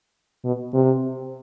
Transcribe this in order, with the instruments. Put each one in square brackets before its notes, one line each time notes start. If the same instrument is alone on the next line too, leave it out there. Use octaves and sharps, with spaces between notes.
[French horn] B2
C3